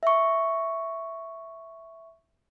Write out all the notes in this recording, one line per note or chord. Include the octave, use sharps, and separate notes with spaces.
E5 C#6